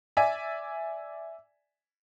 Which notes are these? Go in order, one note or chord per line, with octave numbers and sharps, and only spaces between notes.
D5 E5 G#5